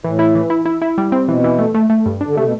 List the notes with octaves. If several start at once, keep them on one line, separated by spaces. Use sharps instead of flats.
A2 E3
E4
E3
E4
E4
E4
G3
C4
B2 E3
E3
A3
A3
A3
G2
D4
D3
C3 A3
B2